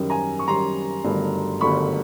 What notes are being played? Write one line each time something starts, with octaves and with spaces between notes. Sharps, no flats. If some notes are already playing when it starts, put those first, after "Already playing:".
Already playing: F#2 D#3 G3
G#5 A#5
C#6
F#2 D#3 G3 A#5 C6
G1 G2 D#3 F#3 A3
G1 G2 D#3 F#3 A3 B5 C#6